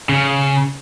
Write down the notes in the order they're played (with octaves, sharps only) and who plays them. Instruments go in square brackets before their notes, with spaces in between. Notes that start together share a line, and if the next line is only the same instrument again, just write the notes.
[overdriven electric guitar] C#3